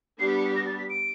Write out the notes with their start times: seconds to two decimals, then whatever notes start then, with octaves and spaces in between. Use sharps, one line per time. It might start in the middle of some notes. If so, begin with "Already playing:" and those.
0.19 G3 B3 D4 G4 C7
0.28 B6
0.37 C#7
0.46 B6
0.55 A#6
0.67 A6
0.79 B6
0.90 D7